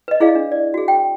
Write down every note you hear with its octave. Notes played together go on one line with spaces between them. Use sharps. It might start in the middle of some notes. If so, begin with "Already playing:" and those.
B4 D#5
E4 G#4 D5 D#5 F5
D4
D5
F#4 G#4
G5